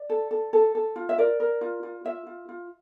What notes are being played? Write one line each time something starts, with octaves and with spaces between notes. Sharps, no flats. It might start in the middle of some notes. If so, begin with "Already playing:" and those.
Already playing: D5
A4
A4
A4
A4
F4
E5
A#4 D5
A#4
F4
F4
F4 E5
F4
F4